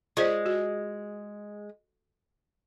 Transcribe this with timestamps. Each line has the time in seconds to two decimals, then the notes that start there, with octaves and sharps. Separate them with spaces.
0.17 G#3 F4 C5 D5
0.46 F#4